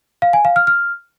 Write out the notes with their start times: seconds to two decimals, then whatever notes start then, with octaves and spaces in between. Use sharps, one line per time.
0.22 F5
0.33 G#5
0.45 F5
0.56 F6
0.67 F6